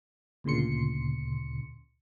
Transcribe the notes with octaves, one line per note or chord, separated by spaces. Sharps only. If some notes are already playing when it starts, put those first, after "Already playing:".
D2 A#2 C#3 C6 C#7